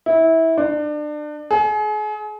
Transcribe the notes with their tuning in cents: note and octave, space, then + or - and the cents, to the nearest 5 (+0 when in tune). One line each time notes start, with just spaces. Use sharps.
E4 -20
D4 +30
G#4 +35